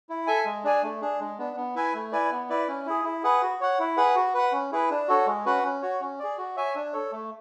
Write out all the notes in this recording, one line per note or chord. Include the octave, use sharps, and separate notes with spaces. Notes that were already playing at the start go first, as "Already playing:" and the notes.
E4
A4 E5 G#5
G#3
D4 G#4 D5 G#5
A3
D4 G#4
G#3
B3 D4
B3
E4 B4 E5 G#5
A3
E4 B4 D5 G#5
B3
E4 B4 D5
C#4
E4 G#4
E4
G#4 B4 F#5
F#4
C#5 F#5
E4
G#4 B4 F#5
F#4
B4 F#5
C#4
E4 G#4 B4
D4
F#4 A4 C#5
G#3
C#4 F#4 B4 F#5
C#4
F#4 C#5
C#4
G#4 D5
F#4
C#5 E5 G#5
D4
A4 C#5
A3